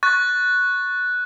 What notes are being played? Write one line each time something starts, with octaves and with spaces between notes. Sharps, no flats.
C#6 F#6 A6